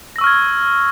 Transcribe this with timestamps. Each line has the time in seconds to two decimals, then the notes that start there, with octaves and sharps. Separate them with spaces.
0.16 A#6
0.18 E6
0.21 C#6
0.24 F6
0.27 G#6